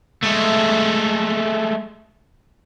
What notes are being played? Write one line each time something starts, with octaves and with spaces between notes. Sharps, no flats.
G#3 A3